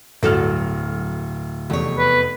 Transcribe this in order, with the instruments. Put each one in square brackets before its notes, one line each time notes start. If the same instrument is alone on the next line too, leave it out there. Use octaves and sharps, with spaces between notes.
[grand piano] D1 F6 [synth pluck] G2 A4 A6 [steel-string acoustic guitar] F#3
[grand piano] F1 [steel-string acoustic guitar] E2 C#5
[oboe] B4